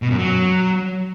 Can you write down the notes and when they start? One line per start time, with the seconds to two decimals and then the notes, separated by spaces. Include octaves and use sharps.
0.02 B2
0.10 F#2
0.19 F#3